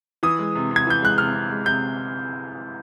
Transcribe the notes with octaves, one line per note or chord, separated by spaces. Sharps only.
E3 D#6
G#3
C3
C3
G#6
E3 G6
G#3 F#6
C3 F6
C3
G#3
C3 G6